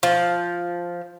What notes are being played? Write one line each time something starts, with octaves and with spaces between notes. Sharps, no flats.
F3